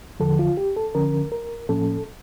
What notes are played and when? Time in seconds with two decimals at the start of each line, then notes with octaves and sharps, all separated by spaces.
0.20 E2 D3 F3 A4
0.39 F4
0.57 G4
0.76 A4
0.95 D3 F3 C#4 A#4
1.32 A#4
1.69 A2 F3 A#3 C#4 A4